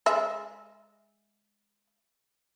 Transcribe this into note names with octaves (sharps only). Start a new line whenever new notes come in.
G#3 E5